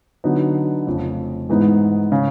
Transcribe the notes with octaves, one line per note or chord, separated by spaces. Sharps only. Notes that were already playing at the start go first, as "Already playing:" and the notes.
D3 F#3 B3 D#4
F1 F2 C#3
G#2 E3 G#3 B3 D#4
C#3